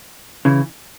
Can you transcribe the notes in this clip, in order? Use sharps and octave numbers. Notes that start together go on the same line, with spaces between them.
C#3 E3